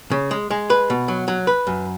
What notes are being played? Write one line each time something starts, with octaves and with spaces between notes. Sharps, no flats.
C#3
G#3
G#3
B4
B2
F#3
F#3
B4
F#2